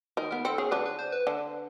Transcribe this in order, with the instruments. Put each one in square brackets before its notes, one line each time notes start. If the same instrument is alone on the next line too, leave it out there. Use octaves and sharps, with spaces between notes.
[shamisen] D#3 D#4 [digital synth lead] A#4
[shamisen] B3 [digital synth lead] A#4
[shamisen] C4 [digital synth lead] A4
[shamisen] C#4 [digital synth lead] G#4
[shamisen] D3 D4 [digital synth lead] B4
[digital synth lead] B4
C5
B4
[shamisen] D3 D4